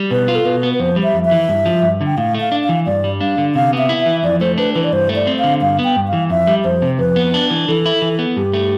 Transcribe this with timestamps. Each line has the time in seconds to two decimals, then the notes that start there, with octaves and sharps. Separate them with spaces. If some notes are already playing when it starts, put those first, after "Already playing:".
Already playing: G3
0.11 B2 B4
0.28 F4
0.35 A4
0.45 B2 B4
0.63 B3
0.73 B4
0.80 F2 C5
0.96 G3
1.03 E5
1.14 F2
1.25 E5
1.31 E3
1.49 G2
1.66 F3
1.82 G2
2.01 D3
2.07 G5
2.17 A2 F5
2.34 A3
2.40 F5
2.52 D4
2.64 F5
2.69 E3
2.86 G2 D5
3.04 G3
3.21 D4 F5
3.38 D3
3.55 C3 F5
3.73 B3
3.78 E5
3.89 E4
4.01 E5
4.06 E3
4.23 F2 D5
4.40 A3 C5
4.58 D4 B4
4.75 E3 B4
4.84 D5
4.92 G2 C5
5.09 A3
5.16 D5
5.27 C4
5.39 F5
5.44 D3
5.61 G2 F5
5.79 B3
5.84 G5
5.96 G2
6.08 F5
6.13 E3
6.30 F2 E5
6.47 G3
6.64 F2 C5
6.82 C3
6.99 F2 B4
7.16 B3
7.34 D4
7.51 E3
7.68 E3 A4
7.86 E4
8.02 E3
8.19 B3
8.36 G2 G4
8.53 A3